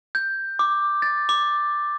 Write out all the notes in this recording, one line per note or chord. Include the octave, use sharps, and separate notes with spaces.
G6
D6
A6
D6